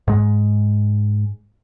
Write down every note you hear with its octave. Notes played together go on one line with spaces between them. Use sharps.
G#2 G#3